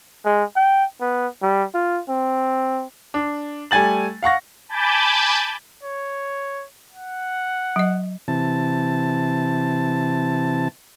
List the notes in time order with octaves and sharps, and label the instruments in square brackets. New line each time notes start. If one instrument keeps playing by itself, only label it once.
[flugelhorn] G#3
G5
B3
G3
F4
C4
[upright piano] D4
G3 A3 G#5 A6 F#7
F5 F#5 C#6 A#6
[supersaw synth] G#5 A5 B5 D6 G6 A6
[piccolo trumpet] C#5
F#5
[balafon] F#3 D#5
[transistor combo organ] C3 E3 A5